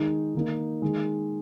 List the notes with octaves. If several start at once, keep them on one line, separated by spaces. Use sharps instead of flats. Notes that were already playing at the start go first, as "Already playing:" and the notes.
Already playing: D#3 G#3 D#4
D#3 A#3 D#4
D#3 G#3